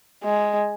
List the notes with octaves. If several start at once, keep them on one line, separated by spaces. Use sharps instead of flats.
G#3